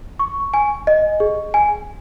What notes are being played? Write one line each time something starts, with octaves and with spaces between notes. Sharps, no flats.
C#6
G#5
D#5
G#4
G#5